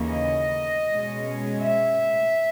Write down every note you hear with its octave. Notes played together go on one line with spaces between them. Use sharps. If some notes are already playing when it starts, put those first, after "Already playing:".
Already playing: D#2 C#3 E3 A#3 C#4
D#5
B2 G#3 C#4
E5